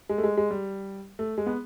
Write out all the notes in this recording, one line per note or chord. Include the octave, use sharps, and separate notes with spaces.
G#3
A3
G#3
G#3
G3
A3
G#3
B3